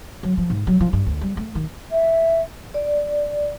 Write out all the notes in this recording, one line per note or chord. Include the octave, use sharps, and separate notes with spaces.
F#3
F3
G#2
F#3
F3
G2
D2
G3
A3
D#3
E5
D5